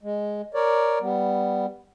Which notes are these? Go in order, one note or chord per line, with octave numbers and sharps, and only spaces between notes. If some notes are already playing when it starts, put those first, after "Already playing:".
G#3
A#4 C#5 D5
G3 B3